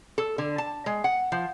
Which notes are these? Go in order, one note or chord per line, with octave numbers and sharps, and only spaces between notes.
A4
D3
A5
G#3
F#5
F3